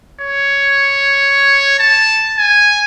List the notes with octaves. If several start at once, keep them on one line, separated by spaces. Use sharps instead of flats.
C#5
A5
G#5